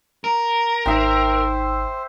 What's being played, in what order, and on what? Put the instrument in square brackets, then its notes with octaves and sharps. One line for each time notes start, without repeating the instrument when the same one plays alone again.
[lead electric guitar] A#4
[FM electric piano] G#1 D#4 C7 [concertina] C5 [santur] E5 G5